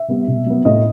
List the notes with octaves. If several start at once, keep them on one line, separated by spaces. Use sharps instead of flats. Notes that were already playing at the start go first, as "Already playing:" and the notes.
Already playing: E5
G3 B3
B2
F#3 B3
A2 D#5